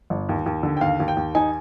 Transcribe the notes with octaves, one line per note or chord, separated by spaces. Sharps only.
G1
D#2
D#2
D3
G5
D#2 F5
D#2
G5
D#2
D#4 G#5